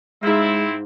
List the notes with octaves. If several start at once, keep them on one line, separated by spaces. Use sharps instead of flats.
G#2 G#3 C4 E4 F5